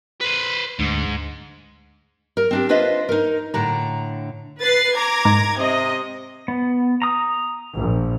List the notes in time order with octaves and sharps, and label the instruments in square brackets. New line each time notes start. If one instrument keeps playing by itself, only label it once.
[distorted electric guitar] B4 C5
[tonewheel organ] D2 [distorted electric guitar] G#2
[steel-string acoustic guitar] A#4
C4 D4 G4
D4 F4 B4 C5 D#5 E5
D#4 A#4
A2 D3 A#5
[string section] B4 A6 C7
A#5 D6 G#6
[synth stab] G#2 A#4
[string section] C3 D#5
[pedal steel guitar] B3
A#5 D#6
[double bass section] A#1